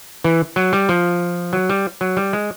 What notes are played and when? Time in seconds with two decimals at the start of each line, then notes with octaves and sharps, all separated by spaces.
0.24 E3
0.56 F#3
0.73 G3
0.89 F3
1.53 F#3
1.69 G3
2.01 F#3
2.17 G3
2.33 G#3